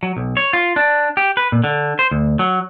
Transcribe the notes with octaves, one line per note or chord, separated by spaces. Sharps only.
F#3
B1
C#5
F4
D4
G4
B4
A#2
D3
C5
D2
F#3